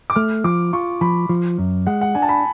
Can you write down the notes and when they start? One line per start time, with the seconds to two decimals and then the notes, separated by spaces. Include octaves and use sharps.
0.10 D6
0.16 A3 F6
0.44 F3 D6
0.73 F4 C#6
1.01 F3 B5
1.29 F3
1.59 F#2
1.87 G#3 F#5
2.01 F#5
2.15 D4 G#5
2.22 A5
2.29 B5